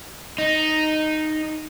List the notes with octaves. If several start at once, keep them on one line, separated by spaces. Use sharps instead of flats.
D#4